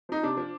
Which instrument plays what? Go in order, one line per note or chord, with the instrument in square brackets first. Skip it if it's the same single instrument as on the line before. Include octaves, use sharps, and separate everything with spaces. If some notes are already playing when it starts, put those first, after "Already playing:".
[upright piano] F3 D#4
C3 D4
F3